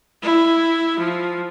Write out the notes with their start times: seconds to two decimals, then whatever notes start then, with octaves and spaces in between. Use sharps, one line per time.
0.23 E4
0.99 F3